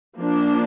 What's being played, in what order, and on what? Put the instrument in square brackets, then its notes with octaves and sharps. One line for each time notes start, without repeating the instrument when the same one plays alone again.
[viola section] F3 A#3 D4